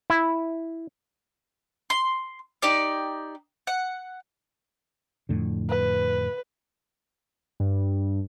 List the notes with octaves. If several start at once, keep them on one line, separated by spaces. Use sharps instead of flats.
E4
C6
D#4 G4 D5
F#5
F2 A2 D3
B4
G2